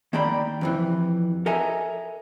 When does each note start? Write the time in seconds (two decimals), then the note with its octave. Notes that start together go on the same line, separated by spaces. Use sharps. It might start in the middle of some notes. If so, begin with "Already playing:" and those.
0.13 D#3 A#3 D5 G5 A#5 B5
0.61 F2 C3 E3
1.46 A4 A#4 D#5 E5 G#5 A#5